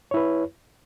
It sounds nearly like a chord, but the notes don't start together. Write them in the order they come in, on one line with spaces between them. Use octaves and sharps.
C#5 E4 B4